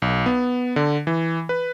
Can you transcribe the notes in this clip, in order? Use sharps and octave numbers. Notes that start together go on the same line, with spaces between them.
B1
B3
D3
E3
B4